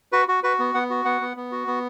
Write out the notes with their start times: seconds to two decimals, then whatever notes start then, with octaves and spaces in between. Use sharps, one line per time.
0.12 F#4 B4
0.28 F#4
0.43 F#4 B4
0.59 B3
0.74 B3 F#5
0.90 F#4
1.05 B3 F#5
1.21 B3
1.36 B3
1.52 F#4
1.67 B3